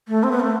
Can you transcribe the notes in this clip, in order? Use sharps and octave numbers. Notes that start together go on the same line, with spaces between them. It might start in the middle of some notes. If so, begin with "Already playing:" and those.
A3
C4
B3
A3